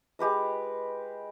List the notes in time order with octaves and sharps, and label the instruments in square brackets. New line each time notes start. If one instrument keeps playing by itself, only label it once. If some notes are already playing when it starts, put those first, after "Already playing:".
[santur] G#3 G4 B4 D#5